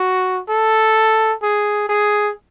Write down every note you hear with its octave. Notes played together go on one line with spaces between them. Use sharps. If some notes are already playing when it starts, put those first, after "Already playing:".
Already playing: F#4
A4
G#4
G#4